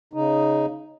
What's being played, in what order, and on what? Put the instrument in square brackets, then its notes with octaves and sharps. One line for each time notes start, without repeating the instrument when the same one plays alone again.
[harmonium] C#3 D#4